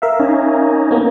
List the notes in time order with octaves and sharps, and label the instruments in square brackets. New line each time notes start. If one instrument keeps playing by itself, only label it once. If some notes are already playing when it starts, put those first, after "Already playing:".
[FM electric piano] A#4 E5 F5
[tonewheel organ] C#4 D#4
[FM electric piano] A#3 B3